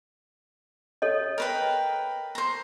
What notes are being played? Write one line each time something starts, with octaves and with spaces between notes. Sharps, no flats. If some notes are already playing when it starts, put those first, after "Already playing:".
A4 C#5 D#5
A#4 B4 G5
C5 A#5